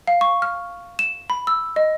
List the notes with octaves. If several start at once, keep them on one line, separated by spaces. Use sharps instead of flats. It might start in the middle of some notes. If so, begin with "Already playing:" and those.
F5
C#6
F6
E7
B5
E6
D#5